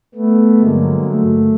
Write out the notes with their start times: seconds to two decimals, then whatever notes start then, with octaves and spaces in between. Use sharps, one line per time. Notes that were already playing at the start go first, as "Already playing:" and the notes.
0.15 A3 B3
0.60 G2 D3 F#3 G#3 A#3
1.04 A3